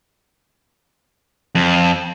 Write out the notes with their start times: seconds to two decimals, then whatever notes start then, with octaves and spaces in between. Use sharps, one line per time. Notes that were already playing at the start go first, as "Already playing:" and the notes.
1.55 F2